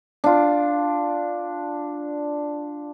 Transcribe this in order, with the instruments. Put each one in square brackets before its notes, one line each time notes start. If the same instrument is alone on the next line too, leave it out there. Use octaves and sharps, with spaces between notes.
[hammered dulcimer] D4 F4